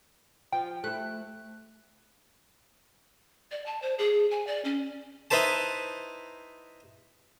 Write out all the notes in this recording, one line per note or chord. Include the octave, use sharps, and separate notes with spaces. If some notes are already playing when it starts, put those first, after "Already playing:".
F3 G5
A3 E4 F#6
D5
A5
C5
G#4
G#5
D5
C#4
D#4 E4 B4 C5 A5